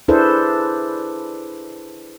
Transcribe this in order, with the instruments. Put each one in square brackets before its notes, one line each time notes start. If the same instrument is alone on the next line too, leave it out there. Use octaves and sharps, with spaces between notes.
[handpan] D4 E4 G#4 A4 B4 C5